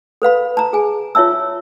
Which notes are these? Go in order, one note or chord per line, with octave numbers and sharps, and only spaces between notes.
A4 B4 F5 B5
A5 A#5
G#4 G#5
F4 C#5 E5 A5 E6